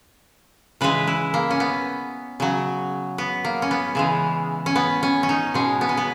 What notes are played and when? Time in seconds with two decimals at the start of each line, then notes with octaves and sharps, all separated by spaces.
0.81 C#3 E3 G#3 B4
1.07 E4
1.34 A#3
1.50 C#4
1.60 B3
2.40 C#3 F#3
3.18 B3
3.45 A#3
3.62 C#4
3.71 B3
3.95 C#3 E3 G#3
4.66 C#4
4.76 B3
5.03 C#4
5.23 C#4
5.29 D#4
5.54 B2 G#3 C#4
5.81 B3
5.89 C#4
5.97 B3